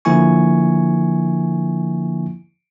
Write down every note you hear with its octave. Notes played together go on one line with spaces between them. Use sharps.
D3 F3 A#3 E4 G#5 C#6